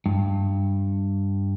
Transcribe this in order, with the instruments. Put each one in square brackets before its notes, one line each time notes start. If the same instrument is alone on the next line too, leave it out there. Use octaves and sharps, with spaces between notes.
[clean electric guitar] G2